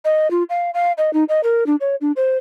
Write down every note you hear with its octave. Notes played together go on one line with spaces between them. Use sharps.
D#5
F4
F5
F5
D#5
D#4
D#5
A#4
D4
C#5
D4
C5